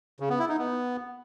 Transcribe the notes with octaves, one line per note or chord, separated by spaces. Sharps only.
C#3
B3
E4
D#4
B3